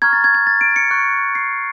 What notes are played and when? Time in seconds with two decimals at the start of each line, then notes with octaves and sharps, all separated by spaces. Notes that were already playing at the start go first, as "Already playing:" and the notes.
0.02 A#5 C#6 F6 G#6
0.13 A6
0.24 G#6
0.35 G#6
0.47 A6
0.61 D7
0.76 C#7
0.91 C#6 F#6
1.35 C7